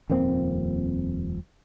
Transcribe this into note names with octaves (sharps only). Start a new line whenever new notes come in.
D#1 F2 A#3 C4